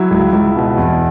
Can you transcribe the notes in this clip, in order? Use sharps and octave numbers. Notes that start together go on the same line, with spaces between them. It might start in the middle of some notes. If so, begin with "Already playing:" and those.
Already playing: F#3 E4
C#2
C#2
B2
E2